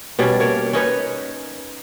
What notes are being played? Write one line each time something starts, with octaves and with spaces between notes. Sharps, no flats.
B2 G3 C#4
A#3 C#5
C#4 D#4 B4 C#5